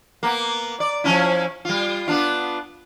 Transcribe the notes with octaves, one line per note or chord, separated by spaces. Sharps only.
A#3 B3
D5
F3 C#4 E4
G3 F4
B3 D4 F4